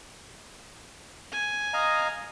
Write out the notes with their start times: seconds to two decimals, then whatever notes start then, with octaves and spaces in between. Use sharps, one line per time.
1.32 G#5
1.74 D#5 F5 A#5